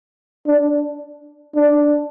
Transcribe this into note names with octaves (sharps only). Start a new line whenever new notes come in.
D4
D4